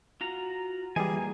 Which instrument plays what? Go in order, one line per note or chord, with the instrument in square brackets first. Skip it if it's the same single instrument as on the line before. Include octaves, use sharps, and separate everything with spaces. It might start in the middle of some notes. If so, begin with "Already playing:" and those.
[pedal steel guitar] F4 F#4 A#5
[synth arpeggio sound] E3 G3 [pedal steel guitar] A#3 G#5 [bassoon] G#4